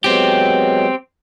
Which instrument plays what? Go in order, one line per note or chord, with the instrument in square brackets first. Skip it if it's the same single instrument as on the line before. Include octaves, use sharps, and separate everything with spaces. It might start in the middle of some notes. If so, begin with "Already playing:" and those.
[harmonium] F#3 G#3 B3 [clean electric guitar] C4 G4